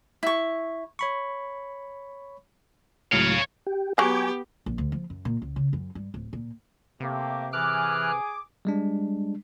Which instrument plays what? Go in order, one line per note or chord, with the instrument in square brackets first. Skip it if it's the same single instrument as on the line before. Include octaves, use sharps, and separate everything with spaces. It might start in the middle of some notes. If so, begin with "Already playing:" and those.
[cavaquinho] E4 C#6
[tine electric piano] C#5 B5 C#6
[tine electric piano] C#2 A2 F#3 [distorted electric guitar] C#5 F5
[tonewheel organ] G4
[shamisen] F#3 G#4 [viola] B3 G4 [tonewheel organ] G5 G#5 D6
[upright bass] A#1
D2
F3
F#2
A#2
C#2
C#3
F#2
G2
D1
A#2
[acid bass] C3 [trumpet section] A3 A#3 G4
[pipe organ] E3 F6 F#6 [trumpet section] G#4 G#5 D#6 [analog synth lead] D6
[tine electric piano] G3 G#3 D4